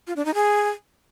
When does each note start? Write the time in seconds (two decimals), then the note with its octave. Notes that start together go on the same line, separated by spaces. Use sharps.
0.07 F4
0.16 D4
0.25 D#4
0.34 G#4